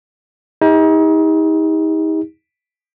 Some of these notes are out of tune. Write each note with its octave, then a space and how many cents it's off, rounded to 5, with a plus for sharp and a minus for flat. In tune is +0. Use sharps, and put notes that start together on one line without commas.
D#4 +35 G4 +45